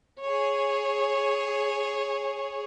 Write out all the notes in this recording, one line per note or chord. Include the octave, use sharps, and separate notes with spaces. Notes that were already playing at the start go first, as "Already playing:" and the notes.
G#4 C#5